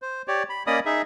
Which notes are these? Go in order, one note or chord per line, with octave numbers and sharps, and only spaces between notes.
C5
G4 C#5 D5
B5
A#3 C#4 D5 D#5 B5 D#6
D#4 G#4 E5